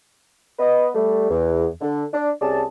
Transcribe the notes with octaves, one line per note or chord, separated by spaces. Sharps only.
B3 B4 D#5
G3 A3
E2
D3
D4
C2 C3 C#4 G#4 D5 A5